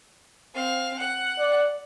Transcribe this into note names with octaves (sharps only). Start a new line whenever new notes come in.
C4 F5
F#5
D5